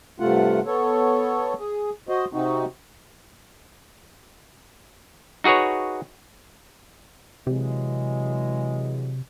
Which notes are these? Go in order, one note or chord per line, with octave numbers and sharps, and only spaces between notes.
G2 C3 A3 F4 F#5
B3 A4 C#5
G#4
F#4 C5 D#5
C3 C4 D#4 F#4
D#4 F#4 G#4 B4 C#5
C3 E3 F#3 G#3